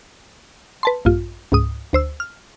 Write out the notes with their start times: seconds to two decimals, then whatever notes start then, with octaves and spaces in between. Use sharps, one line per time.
0.83 B4 A5 C6
1.05 A#1 G2 F4
1.52 C#2 G#2 D#6
1.93 D2 C5 E6
2.20 F6